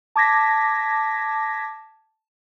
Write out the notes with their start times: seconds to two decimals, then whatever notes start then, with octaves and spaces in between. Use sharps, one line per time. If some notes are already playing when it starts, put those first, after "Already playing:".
0.16 A5 D6 G#6 A#6 B6